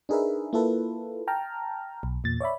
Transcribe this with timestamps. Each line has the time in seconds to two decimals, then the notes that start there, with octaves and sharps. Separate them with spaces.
0.09 D4 D#4 G#4 A#4 B4 E5
0.53 A#3 E4 F4 A4 B4
1.28 G5 A5 A#5 F6
2.03 B1
2.24 E2 A#2 A6
2.41 C#5 D5 E5 B5